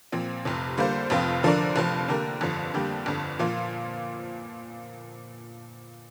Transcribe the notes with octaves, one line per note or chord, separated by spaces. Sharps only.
A#2 F3 C4
F1 F2 C3
D3 G3 A#3 F4 C5
F1 F2 F3 C4 F4
D3 F3 D4 A#4 D5
F1 F2 F3
D3 A#3 G4 A#4
G1 F2 D3 F3
F2 D3 G3 A#3 G4
G1 F2 D3
A#2 F3 A#3 F4